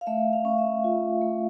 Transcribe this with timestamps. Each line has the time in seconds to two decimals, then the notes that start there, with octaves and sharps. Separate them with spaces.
0.01 F5
0.07 A3 E5
0.33 F5
0.45 C#4
0.58 E5
0.84 F4
1.22 A3